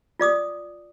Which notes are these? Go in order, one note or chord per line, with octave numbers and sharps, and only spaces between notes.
F4 D5 D6 D#6